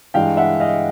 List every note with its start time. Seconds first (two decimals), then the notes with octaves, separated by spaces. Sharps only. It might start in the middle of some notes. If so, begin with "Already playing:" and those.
0.14 G2 E3 G#3 F5 G5
0.37 E5 F#5
0.60 D#5 F5